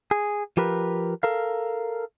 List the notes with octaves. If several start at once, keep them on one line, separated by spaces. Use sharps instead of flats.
G#4
F3 G4 A#4 B4
A4 A#4 F5